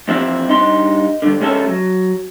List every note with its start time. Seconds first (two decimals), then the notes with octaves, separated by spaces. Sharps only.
0.08 F2 E3 C4 E4 F4 E5
0.48 G2 D#4 C6
1.22 G2 D3
1.41 C#2 G#3 C#4 A4 E5
1.68 F#3